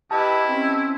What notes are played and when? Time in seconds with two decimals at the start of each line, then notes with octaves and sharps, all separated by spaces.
0.11 E4 G4 B4 D#5 G5 A5 F6
0.48 C4 C#4